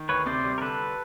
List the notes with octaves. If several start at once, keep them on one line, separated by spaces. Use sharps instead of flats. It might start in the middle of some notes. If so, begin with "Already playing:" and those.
Already playing: D#3
D2 B4 C#5
C3 C5 D5
G3
A#4
D3 A4 B4